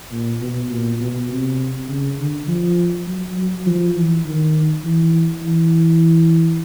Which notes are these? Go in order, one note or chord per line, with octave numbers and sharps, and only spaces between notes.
A#2
B2
A#2
B2
C3
C#3
D3
F3
F#3
F#3
F3
E3
D#3
E3
E3